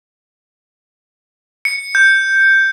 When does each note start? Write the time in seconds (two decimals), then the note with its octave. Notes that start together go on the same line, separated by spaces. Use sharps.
1.65 C#7
1.95 G6